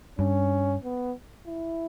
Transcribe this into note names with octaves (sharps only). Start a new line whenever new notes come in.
G2 C#4
B3
E4